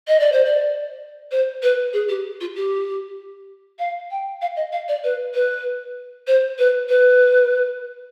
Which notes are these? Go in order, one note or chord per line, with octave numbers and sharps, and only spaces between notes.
D#5
D5
C5
D5
C5
B4
G#4
G4
F4
G4
F5
G5
F5
D#5
F5
D5
B4
B4
C5
B4
B4